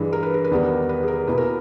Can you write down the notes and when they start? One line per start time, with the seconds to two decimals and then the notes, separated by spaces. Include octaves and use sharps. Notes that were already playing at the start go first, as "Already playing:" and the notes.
Already playing: G2 E3 G#3
0.13 A#4
0.23 B4
0.34 A#4
0.44 B4
0.51 E2 D#3 G3 B3 A#4
0.89 B4
1.03 G#4
1.08 A#4
1.27 E2 B2 A#3 E4 B4
1.38 A#4